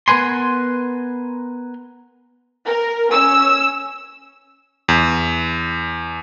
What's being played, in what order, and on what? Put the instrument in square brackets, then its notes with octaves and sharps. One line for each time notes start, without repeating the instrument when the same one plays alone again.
[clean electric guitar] B3 A#4 B4 G#5 C6
[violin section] A#4
C#4 E6
[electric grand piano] E2